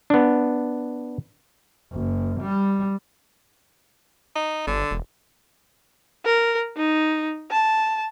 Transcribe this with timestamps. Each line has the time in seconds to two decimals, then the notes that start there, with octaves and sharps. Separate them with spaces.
0.10 B3 D4
1.92 F#1
2.41 G3
4.36 D#4
4.67 G1 D3
4.91 E1
6.25 A#4
6.77 D#4
7.51 A5